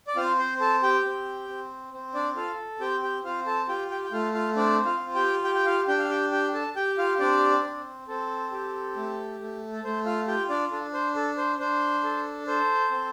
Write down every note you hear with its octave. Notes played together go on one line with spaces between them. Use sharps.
D5
C4 F4 F5
C5
A4 A5
G4 G5
C4
C4
C4
D4 D5
F4 A4 F5
C4 G4 G5
G4 G5
C4 F4 F5
A4 A5
F4 G4 G5
G4 G5
G5
A3 F4 F5
F4 F5
C4 D4 D5
F4 F5
F4
G4 G5
G4 G5
G5
F4 F5
D4 G4 G5
F5
G4 G5
G4 G5
A4 A5
G4 G5
F4 F5
C4 D4 D5
C4
C4 A4
G4
A3
A3
A4
A3 C5
F4 F5
F4 G4 G5
D4 D5
D4 A4
C5
A4
C5
D4 C5
A4
A4 C5
C4